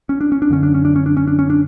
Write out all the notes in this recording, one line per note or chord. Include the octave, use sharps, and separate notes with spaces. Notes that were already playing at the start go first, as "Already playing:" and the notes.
C#4
D4
C#4
D4
F#2 D3 C#4
D4
C#4
D4
C#4
D4
C#4
D4
C#4
D4